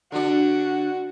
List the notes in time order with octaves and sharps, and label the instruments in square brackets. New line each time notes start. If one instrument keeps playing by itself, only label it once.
[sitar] D3 D4 [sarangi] F#4